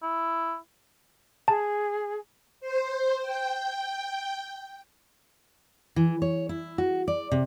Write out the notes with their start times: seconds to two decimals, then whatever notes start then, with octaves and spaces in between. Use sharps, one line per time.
0.02 E4
1.48 G#4 A5
2.60 C5
3.22 G5
5.96 E3
6.22 C#5
6.49 E4
6.78 F#4
7.08 D5
7.32 C3